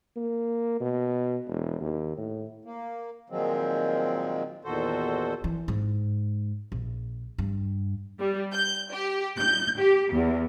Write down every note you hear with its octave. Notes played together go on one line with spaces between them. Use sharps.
A#3
B2
E1
D#2
A2
A#3
A#2 D#3 F3 F#3 G#3 C4
E2 A#2 D#3 F#4 A4 C5
E3
G#2
A#1
G2
G3
G6
G4
G6
G4
E2